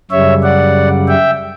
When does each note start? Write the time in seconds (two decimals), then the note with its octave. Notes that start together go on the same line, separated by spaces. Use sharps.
0.11 F#2 C#3 G3 C#5 E5
0.43 D5 F#5
1.08 E5 G5